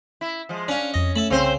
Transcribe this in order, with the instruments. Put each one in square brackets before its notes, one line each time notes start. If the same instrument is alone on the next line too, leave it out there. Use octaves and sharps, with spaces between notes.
[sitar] E4
F3 G#3
[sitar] C#4 [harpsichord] D4 F5
[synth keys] F2 A#6 [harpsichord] D#5
[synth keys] A3 [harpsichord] E5 A5 B5
[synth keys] C2 [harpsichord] C#3 [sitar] C4 C5